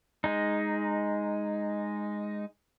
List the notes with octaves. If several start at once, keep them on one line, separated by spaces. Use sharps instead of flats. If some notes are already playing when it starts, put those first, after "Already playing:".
G#3 D#4